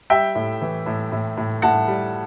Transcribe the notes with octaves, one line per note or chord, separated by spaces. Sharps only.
G3 E5 G5
A2
E3
A2
A2
A2
A2 F#5 A5
G3